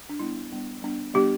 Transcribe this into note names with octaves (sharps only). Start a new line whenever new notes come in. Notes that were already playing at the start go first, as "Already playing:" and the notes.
D4
G3 B3 D4 E4
G3 B3 D4
G3 B3 D4
G3 B3 D4 G4